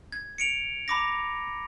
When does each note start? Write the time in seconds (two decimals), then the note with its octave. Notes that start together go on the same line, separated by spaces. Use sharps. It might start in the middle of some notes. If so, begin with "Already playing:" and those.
0.12 G#6
0.38 C#7 D7 F7
0.88 A#5 B5 D6 A#6